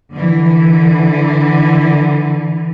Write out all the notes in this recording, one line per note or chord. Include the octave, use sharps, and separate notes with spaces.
D3 E3